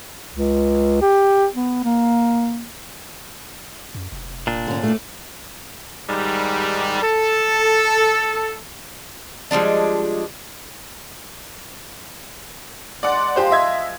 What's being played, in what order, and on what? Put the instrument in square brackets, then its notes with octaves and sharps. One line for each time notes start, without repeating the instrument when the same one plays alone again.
[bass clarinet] C#2
G4
B3
A#3
[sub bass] F#2
F1
[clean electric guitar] A#2 D4
[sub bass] G#2 [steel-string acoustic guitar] D3 C#4
[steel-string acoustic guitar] A3 D5
[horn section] G#2 D#3 G3
A4
[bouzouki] F3 G3 G#3 D4
[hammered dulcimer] G#3 [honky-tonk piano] D5 F#5
[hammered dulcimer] F3 G#3 [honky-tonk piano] G4 C5
[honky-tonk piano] D#5 E5 G#6